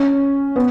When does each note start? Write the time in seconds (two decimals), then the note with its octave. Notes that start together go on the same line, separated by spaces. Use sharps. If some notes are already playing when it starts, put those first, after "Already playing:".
Already playing: C#4
0.56 B3